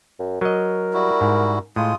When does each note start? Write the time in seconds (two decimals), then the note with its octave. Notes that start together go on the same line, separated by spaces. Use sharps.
0.19 F#2
0.41 F#3 A#4 D#5
0.94 G3 E4 F#4
1.21 G#2
1.76 A2 G#3 F4 D#6